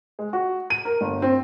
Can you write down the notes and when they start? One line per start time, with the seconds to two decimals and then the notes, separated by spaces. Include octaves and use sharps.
0.19 G#3
0.33 F#4
0.70 D#7
0.85 A#4
1.01 G1
1.22 C4